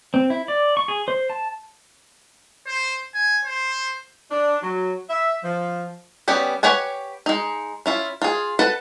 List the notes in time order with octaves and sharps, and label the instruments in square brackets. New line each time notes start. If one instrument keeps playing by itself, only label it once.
[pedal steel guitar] C4
E4
D5
C#6
G#4
C5
A5
[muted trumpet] C5
G#5
C5
[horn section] D4
F#3
E5
F3
[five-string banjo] G3 B3 C#4 G4
G4 B4 C#5 F#5 G#5
G#3 D#4
C#4 E4 F4
F4 G#4
A4 B4 F#5 A5